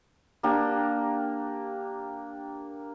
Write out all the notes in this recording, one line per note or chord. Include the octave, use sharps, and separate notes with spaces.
A#3 D4 G4